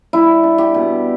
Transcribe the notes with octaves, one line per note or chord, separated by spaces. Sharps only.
G3 E4
D4
G4
B2